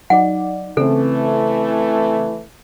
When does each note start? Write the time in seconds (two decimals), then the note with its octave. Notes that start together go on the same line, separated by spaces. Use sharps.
0.10 F#3 D#4 D5 F#5
0.77 C#3 E3 A3 C4 A4